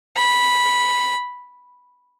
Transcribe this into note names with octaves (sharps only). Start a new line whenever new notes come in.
B5